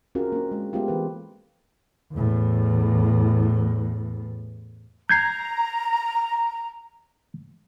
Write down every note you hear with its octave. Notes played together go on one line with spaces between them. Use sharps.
C4 C#4 F4 F#4 G#4 A#4
A#3 D4
G#3
G#3 A3 B3 C4 F4 G4
E3 B4
E2 A2
A#5 G6 G#6 C7